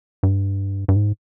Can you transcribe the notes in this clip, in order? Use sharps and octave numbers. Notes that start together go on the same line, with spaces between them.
G2
G2
G#2